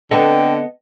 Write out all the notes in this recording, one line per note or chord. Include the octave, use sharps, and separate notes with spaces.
D3 B3 C4 A4 D#5 F#5 G5 A5